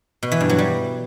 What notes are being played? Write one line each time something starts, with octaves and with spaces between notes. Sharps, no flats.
B2
E3
G2
F#3
G3